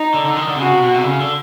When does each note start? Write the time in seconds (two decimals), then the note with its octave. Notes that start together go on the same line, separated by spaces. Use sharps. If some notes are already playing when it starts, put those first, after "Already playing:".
Already playing: D#4
0.14 D3
0.25 D3
0.37 D#3
0.48 D3
0.55 C3
0.59 C#3 F#4
0.71 C3
0.83 B2
0.94 C3
1.00 D3
1.05 C#3
1.20 D3